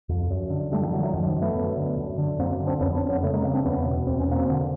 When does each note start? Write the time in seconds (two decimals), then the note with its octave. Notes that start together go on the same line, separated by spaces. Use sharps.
0.09 F2
0.30 F#2
0.50 D3
0.71 D3 G3 A3
0.81 D#3 F3
0.92 D3 E3 F#3
1.03 E3 F#3
1.13 F#2 D#3 F3
1.27 D#3 F3
1.35 F#2
1.42 A3 B3
1.55 F#2
1.77 D3
1.97 F#2
2.18 D3
2.39 F#2 A#3 C4
2.60 D3
2.67 C4 D4
2.81 F2 B3 C#4
2.95 C4 D4
3.03 F2
3.09 B3 C#4
3.23 C#3 A3 B3
3.33 G#3 A#3
3.43 C#3 A#3 C4
3.54 C4 D4
3.65 E2 B3 C#4
3.86 B2
4.07 E2 C4
4.20 C#4
4.28 B2 A#3 C4
4.49 D3